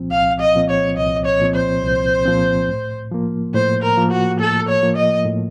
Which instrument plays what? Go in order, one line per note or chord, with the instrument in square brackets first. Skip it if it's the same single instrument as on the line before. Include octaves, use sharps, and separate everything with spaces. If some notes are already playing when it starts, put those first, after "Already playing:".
Already playing: [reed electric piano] C2 A#2 F3 C4
[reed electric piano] C2 [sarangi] F5
[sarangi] D#5
[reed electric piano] A#2 F3 C4
[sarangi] C#5
[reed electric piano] C2 [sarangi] D#5
[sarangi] C#5
[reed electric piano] A#2 F3 C4
[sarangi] C5
[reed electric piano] C2
A#2 F3 C4
A2
F3 A#3
[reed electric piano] A2 [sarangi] C5
[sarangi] A#4
[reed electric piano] F3 A#3
[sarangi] F#4
[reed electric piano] A2 [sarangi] A4
[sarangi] C#5
[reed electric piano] F3 A#3
[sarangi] D#5
[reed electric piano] A2